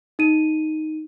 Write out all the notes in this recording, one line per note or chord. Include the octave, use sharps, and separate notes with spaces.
D#4 D#7